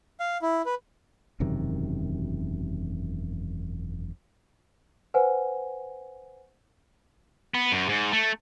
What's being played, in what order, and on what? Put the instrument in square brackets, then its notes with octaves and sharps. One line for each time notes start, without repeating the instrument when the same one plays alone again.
[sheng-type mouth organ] F5
E4
B4
[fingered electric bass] E1 F#2 C3 D#3
[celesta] B4 C5 F#5 G#5
[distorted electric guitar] B3
F#2
G#2
A3